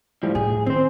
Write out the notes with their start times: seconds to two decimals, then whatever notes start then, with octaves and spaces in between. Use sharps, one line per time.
0.23 A2 F3 G3
0.35 A2 G#4
0.66 D#3 C4 C5